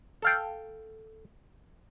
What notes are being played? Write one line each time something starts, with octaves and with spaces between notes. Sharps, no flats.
A4 F5 G5